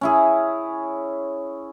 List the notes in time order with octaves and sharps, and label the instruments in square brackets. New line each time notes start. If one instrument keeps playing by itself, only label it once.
[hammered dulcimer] C#4 E4 G#4